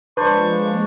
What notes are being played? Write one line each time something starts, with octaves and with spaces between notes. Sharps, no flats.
F3 G#3 A#3 D4 B4 C5 C#6